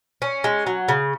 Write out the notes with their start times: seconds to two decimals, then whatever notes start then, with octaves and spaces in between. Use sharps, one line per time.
0.22 C#4
0.44 G#3
0.67 F#3
0.88 C#3